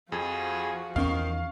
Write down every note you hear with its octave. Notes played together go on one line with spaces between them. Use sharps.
F2 F3 F#4 G#4
E2 D#3 C#4 F5 C#6